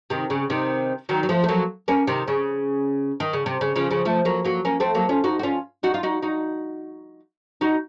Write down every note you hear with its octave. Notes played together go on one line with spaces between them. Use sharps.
C3 D#3
C#3
C3 D#3
D#3 F#3
F#3
F3 A3
A3
F#3 A#3
A#3 C#4
C3 D#3
C#3
D#3
C#3
C3
C#3
C#3 F3
C#3 F3
F3 A3
F#3 A#3
F#3 A#3
A#3 C#4
A3 C4
F#3 A#3
C#4 F4
D#4 F#4
F#4
C#4 F4
D#4 F#4
F4
D#4 F#4
D#4 F#4
D#4 F#4